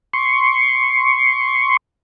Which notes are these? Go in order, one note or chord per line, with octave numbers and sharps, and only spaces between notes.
C6 C#6